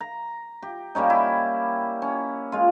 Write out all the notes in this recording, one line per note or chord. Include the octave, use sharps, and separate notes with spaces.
A#5
G4
G3 A#3 C#4 D#4
E4
C#4
G#3 F4